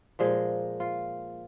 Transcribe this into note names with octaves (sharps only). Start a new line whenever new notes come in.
A#2 F3 G#3 G#4
F4